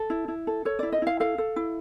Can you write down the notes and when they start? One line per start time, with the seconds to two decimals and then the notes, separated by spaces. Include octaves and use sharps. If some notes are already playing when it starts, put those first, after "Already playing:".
Already playing: A4
0.10 E4
0.28 E4
0.47 A4
0.65 A4 C#5
0.79 E4 D5
0.92 D#5
1.02 E4 F5
1.20 A4 F5
1.38 A4
1.56 E4